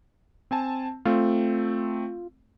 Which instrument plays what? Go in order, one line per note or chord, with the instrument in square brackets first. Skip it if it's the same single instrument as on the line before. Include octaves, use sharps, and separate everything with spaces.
[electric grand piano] C4 G#5 A5
[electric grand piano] A3 C4 [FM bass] F4